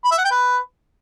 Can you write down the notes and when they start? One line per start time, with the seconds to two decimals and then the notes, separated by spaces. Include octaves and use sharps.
0.05 B5
0.11 E5
0.18 F#5
0.25 G5
0.31 B4